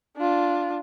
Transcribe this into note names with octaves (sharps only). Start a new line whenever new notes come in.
D4 F4